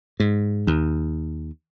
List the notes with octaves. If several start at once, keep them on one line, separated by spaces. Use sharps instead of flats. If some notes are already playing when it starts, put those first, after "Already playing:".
G#2
D#2